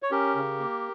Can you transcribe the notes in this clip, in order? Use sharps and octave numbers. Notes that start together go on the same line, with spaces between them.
C#5
C#4 G4 A#4
C#3
A#3